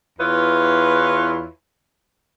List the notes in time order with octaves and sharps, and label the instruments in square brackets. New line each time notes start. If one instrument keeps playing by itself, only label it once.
[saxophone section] E2 E4 F4 B4 C#5